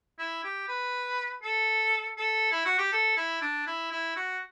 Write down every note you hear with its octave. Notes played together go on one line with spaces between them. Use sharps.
E4
G4
B4
A4
A4
E4
F#4
G4
A4
E4
D4
E4
E4
F#4